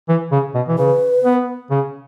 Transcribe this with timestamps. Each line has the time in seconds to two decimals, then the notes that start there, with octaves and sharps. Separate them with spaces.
0.09 E3
0.32 C#3
0.55 B2
0.69 E3
0.78 C#3 B4
1.24 B3
1.71 C#3